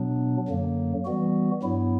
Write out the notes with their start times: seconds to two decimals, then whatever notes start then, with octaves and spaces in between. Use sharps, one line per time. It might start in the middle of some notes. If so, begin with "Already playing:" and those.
Already playing: B2 F#3 B3 D4
0.48 F#2 D3 F#3 A#3
1.05 E3 G3 B3 F#4
1.62 G2 F#3 B3 E4